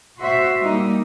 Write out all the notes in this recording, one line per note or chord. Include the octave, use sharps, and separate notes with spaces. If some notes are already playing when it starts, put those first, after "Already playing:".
F#4 C5 E5
G3 A#3 D#4